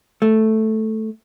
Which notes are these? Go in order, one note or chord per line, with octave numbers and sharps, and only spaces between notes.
A3